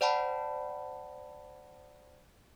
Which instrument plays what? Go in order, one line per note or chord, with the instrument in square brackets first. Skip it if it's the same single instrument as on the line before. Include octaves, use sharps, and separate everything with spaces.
[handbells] C5 D5 F#5 G5 A5 B5